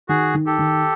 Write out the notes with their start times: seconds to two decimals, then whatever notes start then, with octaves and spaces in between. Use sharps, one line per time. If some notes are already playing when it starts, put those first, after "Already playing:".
0.09 D#3 F#4 G#4
0.34 D#3
0.46 G4 A4
0.59 D#3